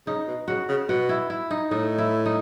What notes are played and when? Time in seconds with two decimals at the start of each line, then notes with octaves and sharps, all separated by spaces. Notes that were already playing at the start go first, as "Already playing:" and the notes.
0.07 C#3 D#4
0.27 B2
0.48 C#3 F#4
0.69 C#3
0.89 B2 F#4
1.09 E4
1.30 E4
1.51 D#4
1.71 A2 D#4
1.98 E4
2.26 D#4